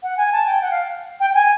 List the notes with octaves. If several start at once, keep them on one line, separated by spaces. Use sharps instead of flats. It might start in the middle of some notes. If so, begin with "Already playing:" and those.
F#5
G#5
A5
G5
F#5
F5
G5
G5
G#5